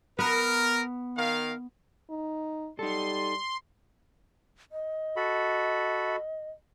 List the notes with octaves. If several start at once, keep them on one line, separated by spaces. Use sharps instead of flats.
B3 A#4
D#3 A#4 F5
D#4
G3 D#4 A4 C6
D#5
F#4 A4 B5